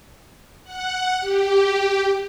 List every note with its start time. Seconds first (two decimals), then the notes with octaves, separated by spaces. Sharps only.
0.64 F#5
1.20 G4